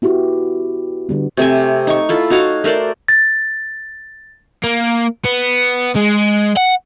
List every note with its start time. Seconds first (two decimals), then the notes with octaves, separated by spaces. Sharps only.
0.02 B3 E4 F#4 G4
1.09 D3 G3 B3
1.37 C3 A3 C4 G#5
1.87 D#4 C#6
2.09 E4 F4 A4
2.30 D#4 F#4 C#5 F5
2.64 A3 A#4 C5 D5
3.08 A6
4.64 A#3
5.25 B3
5.96 G#3
6.57 F#5